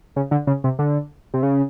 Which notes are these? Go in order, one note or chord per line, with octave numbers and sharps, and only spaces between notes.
C#3
D3
C#3
C3
D3
C3
C#3